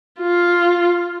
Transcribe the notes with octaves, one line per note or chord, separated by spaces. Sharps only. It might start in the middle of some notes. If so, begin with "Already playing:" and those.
F4